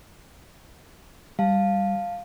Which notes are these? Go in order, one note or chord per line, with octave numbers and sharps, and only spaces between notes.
G3 F5 A5